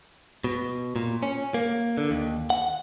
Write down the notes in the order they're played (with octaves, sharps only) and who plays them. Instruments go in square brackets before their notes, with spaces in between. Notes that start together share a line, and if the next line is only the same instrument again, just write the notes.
[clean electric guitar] B2
A#2
C#4
A#3
D3
D#2
F#5